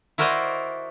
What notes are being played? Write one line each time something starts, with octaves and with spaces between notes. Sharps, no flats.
E4 F#4 A#4 C5 D5 D#5